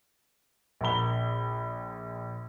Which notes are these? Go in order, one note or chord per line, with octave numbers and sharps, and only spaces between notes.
A#1 A#4 F#5 B5 G7